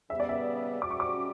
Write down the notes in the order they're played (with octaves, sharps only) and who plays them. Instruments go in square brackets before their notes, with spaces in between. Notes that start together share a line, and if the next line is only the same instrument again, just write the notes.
[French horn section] C#3 G3 B3 [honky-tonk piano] E5
[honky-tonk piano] D5
E5
[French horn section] G3 C#4 F#4 [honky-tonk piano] D6
[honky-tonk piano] C#6
D6